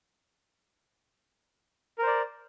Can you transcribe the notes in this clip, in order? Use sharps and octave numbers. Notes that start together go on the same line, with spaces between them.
A#4 C5 D5